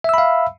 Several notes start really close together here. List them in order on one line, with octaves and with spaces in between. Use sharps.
E5 E6 B5 F5